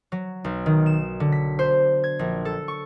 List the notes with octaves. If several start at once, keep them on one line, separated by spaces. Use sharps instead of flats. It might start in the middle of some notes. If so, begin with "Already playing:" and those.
F#3
B1
D#3
E7
D3
B6
C5
G#6
A#1
A4
C#6